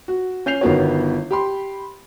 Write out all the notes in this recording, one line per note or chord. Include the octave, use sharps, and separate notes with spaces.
F#4
C#4 G6 C7 F7
G1 D#3 B3 F#4 C#5
G4 B5 C6